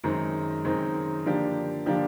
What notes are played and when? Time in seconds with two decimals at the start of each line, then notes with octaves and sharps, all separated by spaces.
0.04 F#2 D#3 G#3 C4 D#4
0.65 F#2 D#3 G#3 C4 D#4
1.26 D3 F3 A#3 D4 G4
1.86 D3 F3 A#3 D4 G4